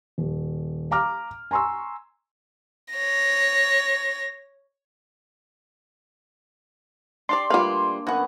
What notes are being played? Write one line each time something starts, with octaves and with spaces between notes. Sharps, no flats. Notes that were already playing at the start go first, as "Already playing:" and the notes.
D#1
F5 A#5 D6 F6
G#5 A#5 C6 C#6 E6
C#5 A#6
D4 G4 D5 C6
D3 G3 A3 A#3 F4 B4 F5
F#2 B3 F#4 F#5 G#5